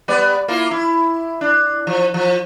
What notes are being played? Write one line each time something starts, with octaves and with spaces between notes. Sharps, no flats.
G3 B3 D5
A#3 E4 F4
E4
D4
F3
F3